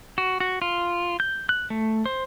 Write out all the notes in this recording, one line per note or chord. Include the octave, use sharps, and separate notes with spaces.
F#4
F#4
F4
G6
F#6
A3
C5